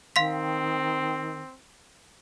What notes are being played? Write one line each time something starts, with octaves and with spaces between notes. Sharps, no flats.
D#3 C4 F5 C6 B6